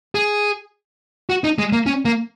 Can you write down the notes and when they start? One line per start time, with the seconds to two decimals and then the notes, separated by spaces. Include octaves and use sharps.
0.15 G#4
1.30 F#4
1.44 D#4
1.58 G#3
1.72 A#3
1.86 C#4
2.05 A#3